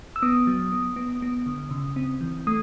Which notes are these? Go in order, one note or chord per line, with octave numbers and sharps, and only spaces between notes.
E6
B3 D#6
F#3
B3
B3
B3
D3
C#3
C4
E3
A3 D#6